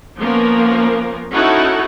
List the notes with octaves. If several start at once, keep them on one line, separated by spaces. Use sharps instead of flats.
F3 A#3 B3 C#4 A#4
C#4 D#4 E4 F#4 A4 F#5